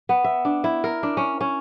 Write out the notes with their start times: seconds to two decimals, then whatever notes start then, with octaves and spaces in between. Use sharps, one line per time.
0.09 B3
0.24 E5
0.45 D4
0.64 E4
0.84 A#4
1.03 D4
1.17 C#4
1.41 C#4